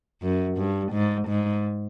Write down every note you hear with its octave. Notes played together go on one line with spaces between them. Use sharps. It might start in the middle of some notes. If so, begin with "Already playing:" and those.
F#2
G2
G#2
G#2